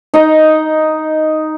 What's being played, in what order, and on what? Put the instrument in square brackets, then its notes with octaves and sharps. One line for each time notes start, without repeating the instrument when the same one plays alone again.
[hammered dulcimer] D#4 D#5